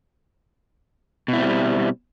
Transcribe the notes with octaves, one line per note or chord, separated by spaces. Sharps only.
B2 G3 C4 E4